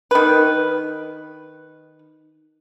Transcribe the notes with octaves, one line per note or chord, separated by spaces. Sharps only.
D#3 B4